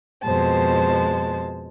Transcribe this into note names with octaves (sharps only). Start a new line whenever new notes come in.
F2 B2 G#3 C5 A5